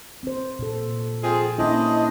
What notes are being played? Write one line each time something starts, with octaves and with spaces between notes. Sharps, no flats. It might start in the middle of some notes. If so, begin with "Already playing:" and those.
C4 C5
A#2 A4
F3 C4 G#4
A#3 C#4 D4 E4 C5 D#5